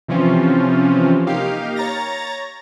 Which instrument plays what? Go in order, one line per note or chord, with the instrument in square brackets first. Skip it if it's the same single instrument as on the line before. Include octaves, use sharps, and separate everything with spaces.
[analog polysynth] C3 E3 F3 C4 C#4 F4
A#3 D#4 G4 F5
C#5 A#5 A6 A#6